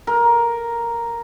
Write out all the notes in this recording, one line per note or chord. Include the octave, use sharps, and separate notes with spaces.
A#4